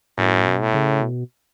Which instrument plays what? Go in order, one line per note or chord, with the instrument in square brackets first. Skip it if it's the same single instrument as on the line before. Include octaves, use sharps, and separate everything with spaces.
[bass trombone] F#2 [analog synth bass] A2
[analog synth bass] B2
[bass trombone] A2
[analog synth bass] C#3
B2